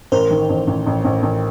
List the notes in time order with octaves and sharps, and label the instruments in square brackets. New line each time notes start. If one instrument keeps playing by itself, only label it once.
[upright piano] A1 [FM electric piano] A#4 C5
[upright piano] D#3
A1
A1
A1
A1
A1